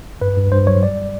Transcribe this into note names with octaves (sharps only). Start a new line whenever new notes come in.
G2 B4
G2
G2 C5
F#3 C#5
G3 D5